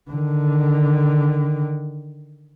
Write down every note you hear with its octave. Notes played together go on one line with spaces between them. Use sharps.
D3 D#3